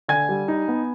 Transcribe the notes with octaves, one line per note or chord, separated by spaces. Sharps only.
D3 G#5 G#6
G3
D#4
B3